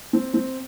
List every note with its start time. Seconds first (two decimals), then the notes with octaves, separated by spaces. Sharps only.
0.13 C4
0.34 C4